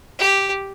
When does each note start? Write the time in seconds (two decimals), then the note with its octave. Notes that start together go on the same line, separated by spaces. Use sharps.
0.19 G4